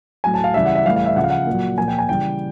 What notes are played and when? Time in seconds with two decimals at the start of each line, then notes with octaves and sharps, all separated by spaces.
0.24 A2 F#3 G#5
0.34 A5
0.44 F5
0.54 C#3 E3 G3 E5
0.66 F#5
0.75 E5
0.85 A2 E3 G3 F5
0.96 F5
1.05 E5
1.16 C#3 F3 F#5
1.24 F5
1.30 F#5
1.47 A#2 F#3
1.78 A#2 F3 G#5
1.88 G5
1.98 G#5
2.08 C#3 E3 G3 G5